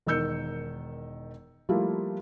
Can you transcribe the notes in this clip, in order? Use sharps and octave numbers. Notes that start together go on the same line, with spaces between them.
E1 D#3 A#4 E6 G6 C#7
F3 G3 A3 A#3 E4 F4